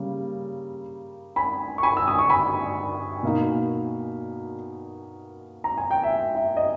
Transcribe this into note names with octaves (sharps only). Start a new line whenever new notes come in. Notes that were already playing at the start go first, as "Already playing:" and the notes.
Already playing: C#3 G3 A#3
G#5 B5
C#6
G#5 B5
E6
D#6
C#6
G#5 B5
B2 A#3 D#4
A#5
G#5
G5
E5
E5
D#5